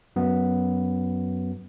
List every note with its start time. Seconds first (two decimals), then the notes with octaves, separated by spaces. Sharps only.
0.16 F#2 B3